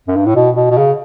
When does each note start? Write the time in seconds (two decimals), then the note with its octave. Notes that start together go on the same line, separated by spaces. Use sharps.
0.07 F#2
0.16 G2
0.26 A2
0.35 B2
0.56 B2
0.70 B2
0.77 C#3